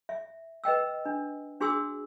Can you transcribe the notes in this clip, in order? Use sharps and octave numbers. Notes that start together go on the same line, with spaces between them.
E5
B4 D#5 G5 E6
D4
D4 F#4 G#4 C6 D#6 E6